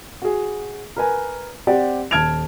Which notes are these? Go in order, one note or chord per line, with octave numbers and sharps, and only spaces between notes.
F#4 G#4
A#4 B4 G#5
C4 G4 D5 F#5
D#1 A5 F6 G#6 D7 F7